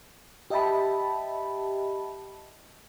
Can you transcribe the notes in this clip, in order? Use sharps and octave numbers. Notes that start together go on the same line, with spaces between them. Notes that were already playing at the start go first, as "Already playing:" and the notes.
G4 D#5 E5 G5 A5 B5